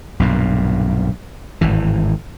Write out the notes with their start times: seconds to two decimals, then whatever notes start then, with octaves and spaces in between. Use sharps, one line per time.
0.20 B1 G2 A#2
1.61 G#1 A2 E3